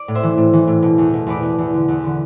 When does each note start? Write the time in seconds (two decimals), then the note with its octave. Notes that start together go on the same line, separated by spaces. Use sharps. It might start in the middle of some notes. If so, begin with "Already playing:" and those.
Already playing: D5
0.08 A2
0.15 C5 E5
0.23 E3
0.37 A2
0.53 E3
0.67 A2
0.82 B2
0.98 E2
1.13 B2
1.27 E2 B4 D5
1.43 B2
1.58 E2
1.74 D3
1.88 E2
2.04 D3